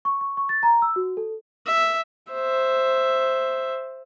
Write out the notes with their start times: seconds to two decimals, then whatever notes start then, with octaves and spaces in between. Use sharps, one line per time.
0.05 C#6
0.21 C#6
0.37 C#6
0.49 A6
0.63 A#5
0.82 E6
0.96 F#4
1.17 A4
1.66 E5
2.32 C5 E5